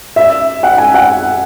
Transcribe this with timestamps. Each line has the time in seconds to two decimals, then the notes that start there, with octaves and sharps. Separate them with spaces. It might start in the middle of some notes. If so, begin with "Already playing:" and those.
0.16 E5
0.63 F#5
0.78 G#5
0.94 F#5